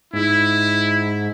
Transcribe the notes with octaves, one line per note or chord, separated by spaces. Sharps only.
G#2 E4